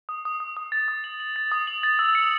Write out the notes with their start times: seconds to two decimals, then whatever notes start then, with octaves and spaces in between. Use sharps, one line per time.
0.09 D#6
0.25 D#6
0.40 D#6
0.57 D#6
0.72 A6
0.88 D#6
1.04 F#7
1.20 F#7
1.36 A6
1.52 D#6
1.67 F#7
1.83 A6
1.99 E6
2.15 C#7